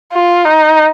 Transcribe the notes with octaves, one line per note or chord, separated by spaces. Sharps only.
F4
D#4